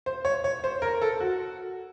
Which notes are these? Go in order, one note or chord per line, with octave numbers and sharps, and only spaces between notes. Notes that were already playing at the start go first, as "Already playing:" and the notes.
C5
C#5
C#5
C5
A#4
A4
F#4